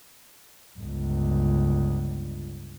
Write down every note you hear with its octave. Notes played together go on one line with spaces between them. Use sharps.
G1 C#2